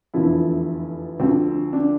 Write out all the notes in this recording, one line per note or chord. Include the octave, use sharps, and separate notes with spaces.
F1 E2 D3 F3 E4
D2 D3 F3 C4
D4